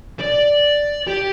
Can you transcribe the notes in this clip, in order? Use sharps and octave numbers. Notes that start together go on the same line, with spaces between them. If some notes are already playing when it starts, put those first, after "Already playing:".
D5
G4